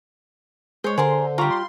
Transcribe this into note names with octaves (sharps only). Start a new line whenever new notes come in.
G#3 C5 C#5
D3 G#4 A#4 C5 C6
G3 F4 D5 A#5 C#6
C6